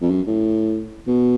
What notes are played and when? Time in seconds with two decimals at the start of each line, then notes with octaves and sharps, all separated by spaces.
0.02 F2
0.11 F#2
0.27 A2
1.07 B2